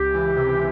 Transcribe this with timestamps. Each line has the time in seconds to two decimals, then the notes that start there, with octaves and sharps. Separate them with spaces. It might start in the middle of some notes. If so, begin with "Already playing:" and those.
Already playing: C#2 G4
0.14 E3
0.37 C3